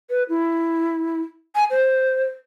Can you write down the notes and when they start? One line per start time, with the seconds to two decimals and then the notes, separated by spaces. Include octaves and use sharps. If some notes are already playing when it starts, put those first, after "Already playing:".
0.10 B4
0.29 E4
1.55 G#5
1.71 C5